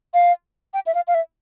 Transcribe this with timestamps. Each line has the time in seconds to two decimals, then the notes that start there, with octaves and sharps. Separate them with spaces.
0.14 F5
0.74 G5
0.86 E5
0.95 F5
1.08 F5
1.14 E5